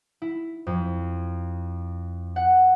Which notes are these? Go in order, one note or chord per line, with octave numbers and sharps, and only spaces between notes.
E4
F2
F#5